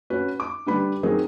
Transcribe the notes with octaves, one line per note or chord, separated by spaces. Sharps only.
C#4 F#4 B4
D6
D3 G3 B4 B5
F#3 C4 D#4 G#4 A#4